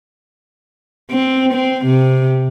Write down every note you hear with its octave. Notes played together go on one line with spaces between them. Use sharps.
C4
C4
C3